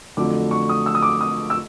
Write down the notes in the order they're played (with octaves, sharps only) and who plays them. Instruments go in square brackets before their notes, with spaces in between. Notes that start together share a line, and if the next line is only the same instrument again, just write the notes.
[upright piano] F2 D3 F#3 A3 D6
C#6
D#6
E6
D#6
D6
D#6
E6